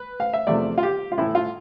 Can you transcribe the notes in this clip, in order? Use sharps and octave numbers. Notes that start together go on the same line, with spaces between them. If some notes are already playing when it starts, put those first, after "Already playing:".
Already playing: B4
F5
E5
E2 C3 F3 A3 D5
F4
G4
F4
A2 E3 A3 E4
F4